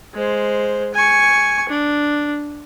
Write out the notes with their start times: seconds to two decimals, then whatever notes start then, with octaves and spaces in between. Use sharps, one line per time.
0.15 G#3 C5
0.94 G#5 C#6
1.69 D4